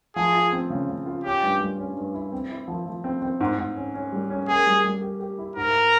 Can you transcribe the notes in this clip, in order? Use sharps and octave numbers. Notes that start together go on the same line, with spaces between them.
F3 G#4
F4
C4
C#3
C#3
F4
C#4 G4
G2
G3
C#4
G2
E4
C4
E4
F3
F3
C4
C4
G#2
G#2
C#4
C#4
G3
C#4
A#3 G#4
G3
G3
G4
G4
E4
G#2 A#4